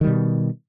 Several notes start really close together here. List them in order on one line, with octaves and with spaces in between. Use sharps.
D#3 G3 B2